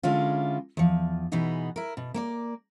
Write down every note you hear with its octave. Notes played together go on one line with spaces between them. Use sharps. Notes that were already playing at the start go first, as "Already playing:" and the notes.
D3 G#3 C#4 E4 F4
E2 F3
B2 E3 B3 D#4 G#4
E4 A#4
B2
A#3 A4 D5